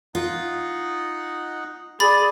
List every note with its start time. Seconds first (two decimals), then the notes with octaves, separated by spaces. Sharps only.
0.15 D#4 F4 D#5 F#5
2.00 G#4 D5 B5 A6